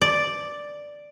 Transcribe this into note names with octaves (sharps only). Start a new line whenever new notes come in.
D5